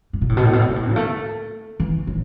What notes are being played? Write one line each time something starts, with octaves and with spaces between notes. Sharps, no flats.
A2
B2
A2
B2
A2
B2
A2
B2
A2
F#3
A3
E3
F#3